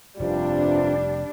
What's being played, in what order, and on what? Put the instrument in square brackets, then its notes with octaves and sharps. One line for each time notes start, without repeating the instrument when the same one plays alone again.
[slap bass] F1 [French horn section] G2 C3 F4 [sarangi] G3 [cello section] D4